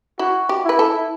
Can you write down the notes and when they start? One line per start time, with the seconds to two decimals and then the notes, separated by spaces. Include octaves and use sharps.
0.19 E4 F#4
0.49 G4
0.65 E4 B4
0.79 A4